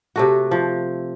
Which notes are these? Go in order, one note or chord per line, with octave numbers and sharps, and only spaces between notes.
C3 A3 F#4
F3